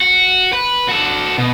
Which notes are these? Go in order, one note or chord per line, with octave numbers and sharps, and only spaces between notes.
F#4
B4
F#4 A4
B2